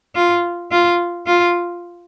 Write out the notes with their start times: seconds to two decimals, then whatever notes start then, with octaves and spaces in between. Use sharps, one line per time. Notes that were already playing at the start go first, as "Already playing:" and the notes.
0.16 F4
0.71 F4
1.27 F4